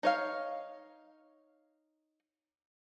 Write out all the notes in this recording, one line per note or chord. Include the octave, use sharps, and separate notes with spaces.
D#4 C#5 F5